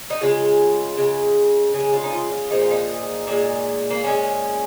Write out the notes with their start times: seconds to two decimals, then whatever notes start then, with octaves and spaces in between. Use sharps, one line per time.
0.10 D#4
0.21 C#3 G#3 F4
0.97 C#3 G#3
1.74 C#3 G#3 G#4
1.93 F4
2.03 D#4
2.13 F4
2.31 F4
2.50 A#2 F3 G#3 D#4
2.61 F4
2.71 D#4
3.27 A#2 G#3
3.90 A#3
4.03 A#2 G#3 C#4